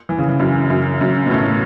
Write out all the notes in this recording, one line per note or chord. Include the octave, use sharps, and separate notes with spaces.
E3
C#3
E3
F#2
F#2
F#2
B2
A2